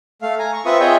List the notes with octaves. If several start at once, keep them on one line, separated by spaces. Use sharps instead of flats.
A3 F5
G#5 A#5
C#6
C4 F4 B4 E5 C#6 D#6
F4 G#4 C#5 D#5 E5 G5